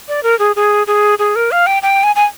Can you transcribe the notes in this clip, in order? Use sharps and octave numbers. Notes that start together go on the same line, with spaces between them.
D5
A#4
G#4
G#4
G#4
G#4
A#4
F5
G5
G5
G#5
G#5